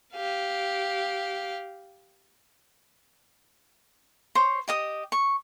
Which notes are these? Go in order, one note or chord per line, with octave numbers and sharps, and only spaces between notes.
G4 F5
C5 C#5
G4 D#5 D#6
C#6